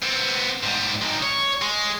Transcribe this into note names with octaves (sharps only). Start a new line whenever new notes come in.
B3 C4
G#2 G3
D#3 G#3
C#5
G#3